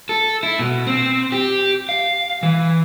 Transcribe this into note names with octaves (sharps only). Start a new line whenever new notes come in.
A4
E4
B2
C4
G4
F5
E3